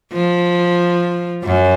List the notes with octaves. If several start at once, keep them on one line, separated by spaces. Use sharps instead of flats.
F3
F#2